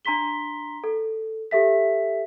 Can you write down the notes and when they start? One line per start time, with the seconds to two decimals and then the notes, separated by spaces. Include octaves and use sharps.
0.05 D4 A#5 C6 B6 G7
0.84 A4
1.51 G4 A4 E5 B6